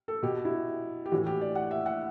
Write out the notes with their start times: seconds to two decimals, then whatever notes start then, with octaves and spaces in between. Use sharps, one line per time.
0.08 A4
0.23 B2 G4
0.45 E4
1.06 G4
1.12 A2 E3 F#4
1.27 G4
1.41 D5
1.55 F#5
1.71 E5
1.86 F#5